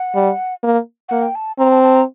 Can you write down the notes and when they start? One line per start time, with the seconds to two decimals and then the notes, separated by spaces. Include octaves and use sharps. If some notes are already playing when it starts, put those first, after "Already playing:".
Already playing: F#5
0.15 G3
0.63 A#3
1.09 A#3 F#5
1.22 G5
1.35 A5
1.59 C4 A#5
1.71 A5
1.83 A5
1.95 A#5